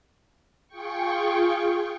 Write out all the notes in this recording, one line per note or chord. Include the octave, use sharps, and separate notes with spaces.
F4 G#4 G5 C#6